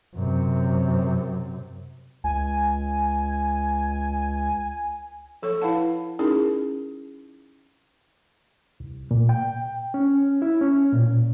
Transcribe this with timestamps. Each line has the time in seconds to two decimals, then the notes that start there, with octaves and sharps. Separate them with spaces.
0.14 F#2 C3
2.24 C#2 G#5
5.43 F3 A4 C#5 C#6
5.61 E4 B4 F5 F#5 A5
6.19 C#4 D#4 E4 G#4 A#4
8.80 C2
9.11 A#2
9.29 G5
9.94 C#4
10.42 E4
10.61 C#4
10.92 A#2